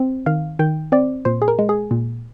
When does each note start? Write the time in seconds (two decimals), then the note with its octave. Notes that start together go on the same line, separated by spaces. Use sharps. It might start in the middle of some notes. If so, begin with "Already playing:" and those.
Already playing: C4
0.26 D#3 F5
0.59 D#3 G5
0.92 C4 D5
1.25 A#2 C5
1.42 G#4
1.48 A#4
1.59 G#3
1.69 G#4
1.91 A#2